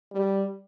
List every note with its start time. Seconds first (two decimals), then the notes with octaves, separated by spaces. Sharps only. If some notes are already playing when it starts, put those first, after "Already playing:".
0.12 G3